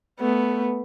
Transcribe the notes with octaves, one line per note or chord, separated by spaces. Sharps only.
A3 B3